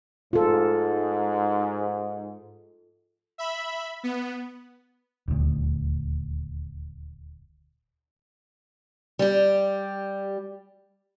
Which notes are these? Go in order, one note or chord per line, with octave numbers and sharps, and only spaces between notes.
G#2 F4 A4
E5 B5
B3
D#1 D2
G3 G4